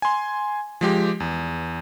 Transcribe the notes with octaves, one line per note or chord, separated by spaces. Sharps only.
G#5 C6
F3 G#3 G4
E2